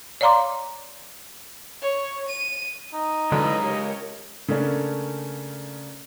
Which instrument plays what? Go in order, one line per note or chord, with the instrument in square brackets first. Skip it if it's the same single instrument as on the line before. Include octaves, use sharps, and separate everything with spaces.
[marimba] C#5 D5 F5 A#5 C6 D6
[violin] C#5
D#7
[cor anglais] D#4
[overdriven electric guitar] C#2 [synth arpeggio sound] D3 F#3 [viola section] E3 B5
[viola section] G4 A#4 C#5
[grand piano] C#3 A3 A#3 C#4 D4